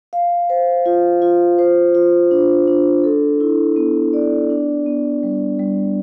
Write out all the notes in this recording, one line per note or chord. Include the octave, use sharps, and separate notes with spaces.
F5
C5
F4
F4
C5
F4
D4
D4
A4
E4
B3
D5
D4
B3
G3
G3